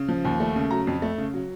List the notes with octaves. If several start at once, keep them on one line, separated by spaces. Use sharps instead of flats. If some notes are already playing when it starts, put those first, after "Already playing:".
Already playing: C#3
F3
D#2
A3
C#3
F#3 A#5
F2
A3
C#3
F#3